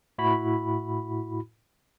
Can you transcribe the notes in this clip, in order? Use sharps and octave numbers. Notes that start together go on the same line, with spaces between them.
A2 E4 F#4 B5